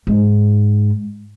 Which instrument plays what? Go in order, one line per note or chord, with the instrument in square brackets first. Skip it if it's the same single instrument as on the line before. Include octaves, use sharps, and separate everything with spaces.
[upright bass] G#2